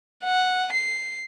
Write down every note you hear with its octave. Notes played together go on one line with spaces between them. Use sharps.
F#5
C7